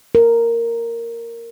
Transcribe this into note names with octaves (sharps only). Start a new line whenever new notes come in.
A#4